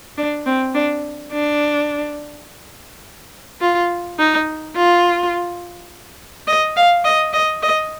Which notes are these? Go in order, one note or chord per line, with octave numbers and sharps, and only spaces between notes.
D4
C4
D4
D4
F4
D#4
F4
D#5
F5
D#5
D#5
D#5